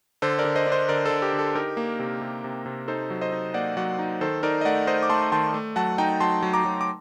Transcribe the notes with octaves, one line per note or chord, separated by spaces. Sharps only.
D3 A4 C5
A#4 D5
D3
C5 D#5
D4 C5 D#5
D3 A#4 D5
D3 A4 C5
G4 A#4
D3
A4
D#4 G4 A#4
A#3
C3
C3
C3
C3
D#4 A4 C5
F#3
C5 D#5
D#4
A#3 D5 F#5
F#3 D5 F#5
D#4
D#3 A4 C5
D#4 A#4 D5
D#5
A3 D5 F#5
D#4 C5 D#5
D6
A3 A5 C6
D#3 A5 C6
A3
F#3 F#5 A5
D#4 G5 A#5
F#3 A5 C6
F#3
A#5 D6
F#3
D6